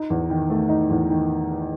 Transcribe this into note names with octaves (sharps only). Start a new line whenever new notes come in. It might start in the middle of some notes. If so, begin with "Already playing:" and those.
Already playing: D#4
E2
D#3
A3
D#4
E2
D#3